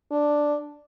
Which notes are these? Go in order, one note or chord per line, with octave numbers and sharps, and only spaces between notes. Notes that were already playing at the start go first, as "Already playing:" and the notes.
D4